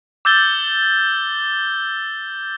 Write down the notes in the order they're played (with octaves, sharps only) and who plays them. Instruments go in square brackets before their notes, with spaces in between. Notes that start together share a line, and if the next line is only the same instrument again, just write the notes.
[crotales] D6 E6 G6 A6 G7